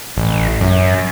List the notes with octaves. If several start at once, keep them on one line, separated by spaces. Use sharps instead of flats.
A1
F#2